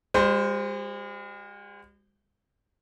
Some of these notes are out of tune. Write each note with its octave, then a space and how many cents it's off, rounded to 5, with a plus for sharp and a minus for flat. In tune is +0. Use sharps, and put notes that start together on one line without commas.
G#3 -45 F#4 +10 C5 +0